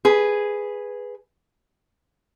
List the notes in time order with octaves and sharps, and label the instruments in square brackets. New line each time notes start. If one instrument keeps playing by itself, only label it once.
[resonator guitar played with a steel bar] G#4 B4